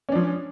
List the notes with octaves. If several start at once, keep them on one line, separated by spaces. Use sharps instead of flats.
F3 C#4 D4